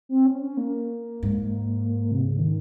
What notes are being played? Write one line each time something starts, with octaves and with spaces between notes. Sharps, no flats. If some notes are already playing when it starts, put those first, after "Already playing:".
C4
C#4
C#4
A#3
G#2
C3
C#3
D#3